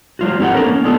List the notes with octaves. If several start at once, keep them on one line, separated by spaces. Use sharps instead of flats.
G3 F4 F#4
C4 D#4 G4 A#4 F#5
C4 D4 F#4 A4 A#4 C#5
A#3 C#4
B3 D4 D#4 F4 A4